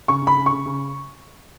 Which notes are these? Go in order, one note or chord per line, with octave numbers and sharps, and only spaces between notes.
C#3 C#6
C#3 B5
C#3
C#6
C#3
C#3